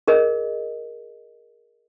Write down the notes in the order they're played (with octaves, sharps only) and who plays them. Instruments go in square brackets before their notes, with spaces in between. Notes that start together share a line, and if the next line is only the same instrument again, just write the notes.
[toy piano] G#4 A#4 D#5